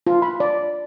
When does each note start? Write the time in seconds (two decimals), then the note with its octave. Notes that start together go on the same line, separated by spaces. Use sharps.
0.07 F4
0.22 B5
0.40 D5